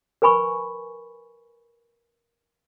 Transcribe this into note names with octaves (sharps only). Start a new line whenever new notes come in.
A#4 B4 G#5 B5 C#6